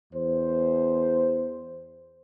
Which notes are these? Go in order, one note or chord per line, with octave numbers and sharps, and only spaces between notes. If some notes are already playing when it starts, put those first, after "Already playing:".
E2 C5